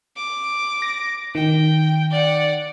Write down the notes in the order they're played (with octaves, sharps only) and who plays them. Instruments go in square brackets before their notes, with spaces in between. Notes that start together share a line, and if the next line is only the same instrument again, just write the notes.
[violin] D6
[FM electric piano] A#6
[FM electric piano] D#3 [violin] G5
[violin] D5 F#5